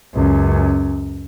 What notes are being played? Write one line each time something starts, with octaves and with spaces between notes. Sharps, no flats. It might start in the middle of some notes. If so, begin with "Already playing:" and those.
C#2 F#2